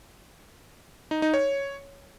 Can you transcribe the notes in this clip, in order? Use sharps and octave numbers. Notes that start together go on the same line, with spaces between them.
D#4
D#4
C#5